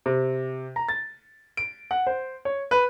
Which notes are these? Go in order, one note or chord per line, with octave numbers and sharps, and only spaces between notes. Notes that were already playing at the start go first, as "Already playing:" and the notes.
C3
A#5
A6
D7
F#5
C5
C#5
B4